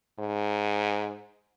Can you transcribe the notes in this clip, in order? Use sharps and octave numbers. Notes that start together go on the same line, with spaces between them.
G#2